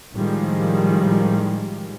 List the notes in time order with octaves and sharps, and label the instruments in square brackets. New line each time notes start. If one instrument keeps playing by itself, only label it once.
[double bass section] A2 D#3 F3 G3 G#3